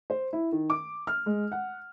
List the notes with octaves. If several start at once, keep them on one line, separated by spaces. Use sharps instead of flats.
C5
E4
D#3
D6
F6
G#3
F#5